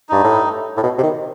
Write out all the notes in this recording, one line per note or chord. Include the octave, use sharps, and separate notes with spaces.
G2 D#4
A2
A2
B2
C3
D#3